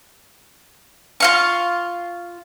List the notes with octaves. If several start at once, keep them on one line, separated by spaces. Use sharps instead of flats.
F4 F5 C#6